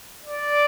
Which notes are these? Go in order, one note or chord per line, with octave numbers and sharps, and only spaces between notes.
D5